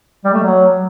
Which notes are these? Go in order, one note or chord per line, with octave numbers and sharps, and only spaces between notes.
G3
A3
F#3